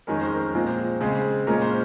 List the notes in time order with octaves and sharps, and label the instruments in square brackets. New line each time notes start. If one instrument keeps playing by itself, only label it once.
[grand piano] F2 D#3 G#3 C#4 A#4
C5
A#4
A#2 F3 G#3 C4 C5
C#3 G#3 C4
A#2 G#3 C#4 A#4
C5